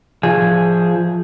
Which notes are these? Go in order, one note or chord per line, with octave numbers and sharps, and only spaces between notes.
F3 G#4